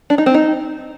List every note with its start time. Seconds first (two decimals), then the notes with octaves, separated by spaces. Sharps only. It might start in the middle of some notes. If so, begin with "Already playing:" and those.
0.10 D4
0.18 D#4
0.26 C4
0.34 D#4